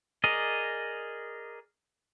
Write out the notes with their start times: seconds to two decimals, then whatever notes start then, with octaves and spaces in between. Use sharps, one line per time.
0.24 G#4 A#4 D5 D#5